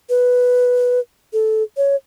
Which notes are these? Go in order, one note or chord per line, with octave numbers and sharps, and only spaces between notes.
B4
A4
C#5